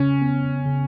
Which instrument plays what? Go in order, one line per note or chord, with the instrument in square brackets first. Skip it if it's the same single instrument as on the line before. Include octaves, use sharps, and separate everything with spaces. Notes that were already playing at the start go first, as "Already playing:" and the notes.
Already playing: [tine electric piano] C#3 [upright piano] C#4
[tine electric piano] B3
C#3